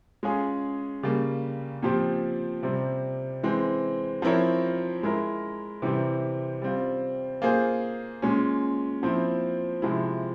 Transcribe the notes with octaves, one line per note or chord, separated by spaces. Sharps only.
G#3 C#4 F4 G#4
C#3 G3 A#3
A#2 F3 C4 G4
C3 G3 C4
E3 G#3 C4
F3 C4 E4 A#4 C#5
G#3 E4 A#4
C3 E3 G3 C4 G4
G3 C4 F4
A#3 F4 G#4 C5
A#2 G#3 C#4
A#2 F3 C4 E4
C3 F3 G#3 E4